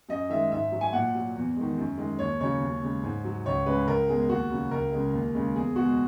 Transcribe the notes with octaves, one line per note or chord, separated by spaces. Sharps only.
F#2 D#5
D#3 G#3 E5
G#2 E5
F#3
G#5
A#2 F#5
F#3
E2
D#3 G#3
F#2
D#3 G#3
D#2 C#5
C#3 F#3 C#5
D#2
C#3 G#3
G#2
F#3
C#2 C#5
C#3 G#3 B4
C#2 A#4
B2 G#3 G#4
D#2 F#4
C#3 F#3
C#2 A#4
C#3 G#3
D#2
C#3 G#3
E2 G#4
B2 G#3 F#4